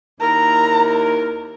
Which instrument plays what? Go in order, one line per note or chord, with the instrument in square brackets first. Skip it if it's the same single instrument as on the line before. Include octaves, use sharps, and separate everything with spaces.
[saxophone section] D#2 E4 A#4 [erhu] A#5